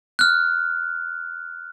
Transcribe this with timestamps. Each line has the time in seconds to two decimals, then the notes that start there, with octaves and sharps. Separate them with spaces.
0.19 F6 F#6